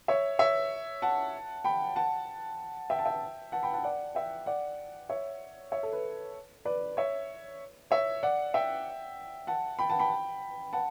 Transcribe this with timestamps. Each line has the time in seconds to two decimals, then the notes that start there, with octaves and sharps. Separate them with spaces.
0.08 C#5 E5
0.39 C#5 E5
1.02 F#5 A5
1.65 G5 B5
1.96 F#5 A5
2.90 E5 G5
2.99 A5
3.05 E5 G5
3.52 F#5 A5
3.63 G5 B5
3.73 F#5 A5
3.84 D5 F#5
4.15 E5 G5
4.46 D5 F#5
5.09 C#5 E5
5.72 C#5 E5
5.83 A4
5.93 B4
6.65 B4 D5
6.97 C#5 E5
7.91 C#5 E5
8.23 D5 F#5
8.54 E5 G5
9.47 F#5 A5
9.79 G5 B5
9.90 F#5 A5
9.99 G5 B5
10.73 F#5 A5